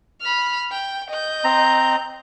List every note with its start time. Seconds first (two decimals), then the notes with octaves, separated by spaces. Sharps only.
0.21 B5 F6
0.72 G5
1.10 D#5 G6
1.44 C4 A#5